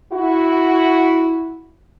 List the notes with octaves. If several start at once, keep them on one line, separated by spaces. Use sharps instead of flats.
E4 F#4